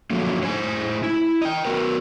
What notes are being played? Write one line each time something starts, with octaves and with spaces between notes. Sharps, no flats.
D3 F3 F#3 A3 A#3
A2 C5 G#5
E4
D#5 G5
B3 F#4 A#4 B4